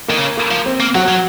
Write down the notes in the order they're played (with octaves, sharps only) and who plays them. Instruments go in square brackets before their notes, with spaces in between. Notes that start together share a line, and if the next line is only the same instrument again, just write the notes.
[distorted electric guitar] D#3 [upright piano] A#3
[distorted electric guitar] C#3
[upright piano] A#3
[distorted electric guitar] F3
[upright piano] C4
[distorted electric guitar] A#3
[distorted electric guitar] F#3 [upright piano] F#4
[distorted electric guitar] F#3